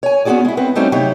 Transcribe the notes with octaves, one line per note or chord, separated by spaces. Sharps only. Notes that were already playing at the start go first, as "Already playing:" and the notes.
C#5 G#5
B3 C#4 D#4 F#4 G#4 D5
G#3 E4
B3 C4 B4
G3 A3 C4 C#4 D#4 F#4
C3 F#3 D#4 E4 G4